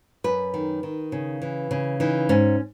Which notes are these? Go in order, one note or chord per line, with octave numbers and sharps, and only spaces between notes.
F#2 B4
D#3
D#3
C#3
E3
C#3
E3 D#4
G#2 C#4